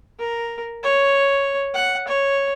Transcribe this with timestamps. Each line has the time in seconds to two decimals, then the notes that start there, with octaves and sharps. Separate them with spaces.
0.19 A#4
0.83 C#5
1.74 F#5
2.08 C#5